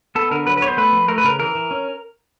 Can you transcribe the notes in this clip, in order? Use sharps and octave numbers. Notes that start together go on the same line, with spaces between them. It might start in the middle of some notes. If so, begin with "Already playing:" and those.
B3 A4
D3 A#4
F#3 B4
B4
B3 C#5
C5
A3 B4
F3
A3 A#4
B4
C#3 A#4
E3 A#4
E3
C#4